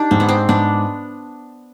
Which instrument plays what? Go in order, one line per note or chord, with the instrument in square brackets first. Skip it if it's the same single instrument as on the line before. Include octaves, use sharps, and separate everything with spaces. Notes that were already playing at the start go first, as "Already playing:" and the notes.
Already playing: [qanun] D4 G4 [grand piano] D#4
[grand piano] G#2 [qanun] C4
[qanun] B3
C4
[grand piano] G#2 [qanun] B3 D4